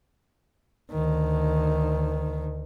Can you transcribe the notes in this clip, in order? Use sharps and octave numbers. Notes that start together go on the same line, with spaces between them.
D2 D#3